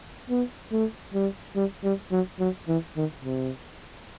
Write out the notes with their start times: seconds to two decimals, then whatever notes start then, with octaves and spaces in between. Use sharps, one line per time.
0.30 B3
0.72 A3
1.14 G3
1.56 G3
1.84 G3
2.12 F#3
2.40 F#3
2.68 E3
2.96 D#3
3.25 C3